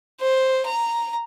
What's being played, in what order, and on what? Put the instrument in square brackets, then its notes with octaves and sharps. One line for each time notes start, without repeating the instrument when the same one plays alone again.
[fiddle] C5
A#5